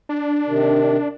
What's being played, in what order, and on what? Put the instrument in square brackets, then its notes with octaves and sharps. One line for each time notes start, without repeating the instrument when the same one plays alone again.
[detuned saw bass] D4
[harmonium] C3 D#3